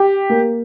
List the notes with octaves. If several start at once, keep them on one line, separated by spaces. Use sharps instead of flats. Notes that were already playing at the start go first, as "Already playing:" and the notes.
Already playing: G4
A#3